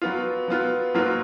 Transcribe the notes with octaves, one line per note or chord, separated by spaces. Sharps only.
F#3 B3 F4
F#3 B3 F4
G#2 F#3 A#3 F4